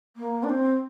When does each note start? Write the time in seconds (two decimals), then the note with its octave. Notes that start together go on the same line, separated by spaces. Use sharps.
0.16 A#3
0.43 D4
0.49 C4